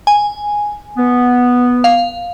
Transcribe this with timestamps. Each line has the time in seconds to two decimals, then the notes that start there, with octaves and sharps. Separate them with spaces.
0.07 G#5
0.97 B3
1.84 F5